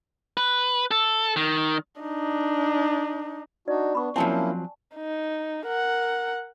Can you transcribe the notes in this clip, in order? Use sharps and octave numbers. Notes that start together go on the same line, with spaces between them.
B4
A4
D#3
D4 D#4
D4 D#4 F#4 D5
B3 D4 B5 C#6
F3 F#3 A#3 C4 C#4 E4 G#5 A5
D#4
A#4 F#5